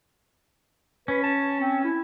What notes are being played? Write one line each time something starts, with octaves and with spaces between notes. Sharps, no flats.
C#4 B4
A5
C4
E4